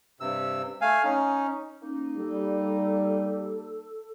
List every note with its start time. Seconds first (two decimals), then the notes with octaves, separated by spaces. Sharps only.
0.20 G2 C3 E6
0.81 A3 F5 G#5
1.04 C#4 D#4
1.82 A#3 C#4 D#4
2.16 G3 A4